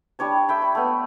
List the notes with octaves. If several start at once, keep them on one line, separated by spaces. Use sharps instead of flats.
G3 D4 C#5 A5
E5 G5 B5
B5
A3 B3